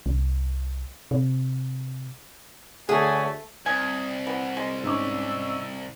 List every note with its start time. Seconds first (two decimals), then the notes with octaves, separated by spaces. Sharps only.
0.06 C2
1.11 C3
2.89 D2 A3 G#4 C#5 F#5 G#5
3.66 C2 G#5 D#6
4.27 E3 F#5
4.57 G#3 D#5
4.83 G#2 C#4 D6 E6